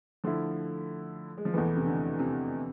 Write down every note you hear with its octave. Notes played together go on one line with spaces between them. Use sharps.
D3 F3 A3 E4
G#3
F3
E2 B2 E3 A3
C3
D3
C3